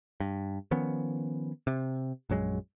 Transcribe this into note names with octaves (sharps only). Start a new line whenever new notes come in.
G2
D#3 F3 B3 C#4
C3
A#1 F#2 F#3 G#3